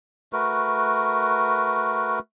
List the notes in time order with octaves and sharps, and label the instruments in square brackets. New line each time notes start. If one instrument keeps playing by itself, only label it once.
[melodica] A3 F#4 A#4 B4